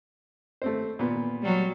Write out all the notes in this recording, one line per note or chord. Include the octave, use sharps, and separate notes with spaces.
A3 C4 C5
A#2 B3
F#3 G3